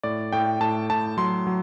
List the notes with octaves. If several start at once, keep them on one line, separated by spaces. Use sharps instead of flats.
A2 D5
A2 G5
A2 A5
A2 A5
F#3 C6
F#3